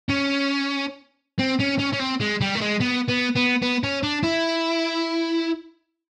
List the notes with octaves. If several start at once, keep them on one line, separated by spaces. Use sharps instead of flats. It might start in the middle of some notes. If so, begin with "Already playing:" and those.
C#4
C4
C#4
C#4
C#4
C4
G#3
G3
A3
G#3
B3
B3
B3
B3
C#4
D4
E4